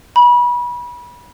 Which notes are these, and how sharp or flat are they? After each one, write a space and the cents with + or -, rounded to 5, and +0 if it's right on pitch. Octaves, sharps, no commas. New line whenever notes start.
B5 -30